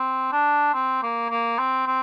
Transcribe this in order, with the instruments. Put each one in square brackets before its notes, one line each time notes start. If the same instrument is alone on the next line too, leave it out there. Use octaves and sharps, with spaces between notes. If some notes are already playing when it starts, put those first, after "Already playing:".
Already playing: [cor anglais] C4
D4
C4
A#3
A#3
C4
C4